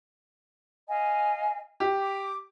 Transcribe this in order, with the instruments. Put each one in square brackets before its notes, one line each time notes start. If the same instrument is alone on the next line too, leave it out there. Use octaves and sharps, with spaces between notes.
[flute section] D#5 F5 G#5
[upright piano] G4
[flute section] D6